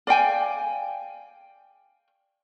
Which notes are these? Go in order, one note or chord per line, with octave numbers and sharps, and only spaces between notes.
D5 F5 G5 G#5